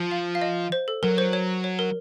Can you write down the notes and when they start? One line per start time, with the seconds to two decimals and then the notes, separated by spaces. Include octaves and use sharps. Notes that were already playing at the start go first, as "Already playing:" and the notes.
Already playing: F3
0.11 F5
0.35 F5
0.42 D#5
0.72 C5
0.88 A4
1.03 F#3 A#4
1.18 C5
1.33 C#5
1.64 C#5
1.79 A#4